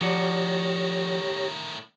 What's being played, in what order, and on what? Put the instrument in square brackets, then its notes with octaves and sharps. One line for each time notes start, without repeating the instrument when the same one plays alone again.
[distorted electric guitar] A2 D#3 [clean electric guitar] F3 F#4 D5 [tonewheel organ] G4 C#5 A#6